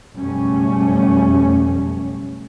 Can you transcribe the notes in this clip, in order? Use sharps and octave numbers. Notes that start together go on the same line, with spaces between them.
F#1 F2 B2 G3 A3 C#4